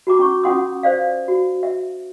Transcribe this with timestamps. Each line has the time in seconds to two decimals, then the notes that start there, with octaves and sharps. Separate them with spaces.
0.07 F#4 A#5 D6
0.19 C#4 C#6
0.43 C#4 F4 F#5 C6 D#6
0.83 C5 D5 F5
1.28 F#4
1.63 E5